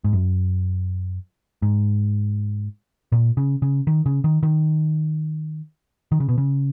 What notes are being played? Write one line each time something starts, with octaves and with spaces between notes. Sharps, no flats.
G#2
F#2
G#2
A#2
C#3
C#3
D#3
C#3
D#3
D#3
D#3
C#3
B2
C#3